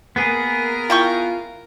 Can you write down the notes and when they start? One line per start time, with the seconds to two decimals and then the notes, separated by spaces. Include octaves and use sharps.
0.16 A#3 B3 G#4 A#4
0.90 E4 F4 G5 C#6